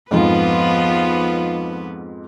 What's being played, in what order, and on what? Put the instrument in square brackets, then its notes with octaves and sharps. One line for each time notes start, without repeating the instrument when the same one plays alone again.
[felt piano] F2 G#2 [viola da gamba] F3 B3 B4 [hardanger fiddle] F4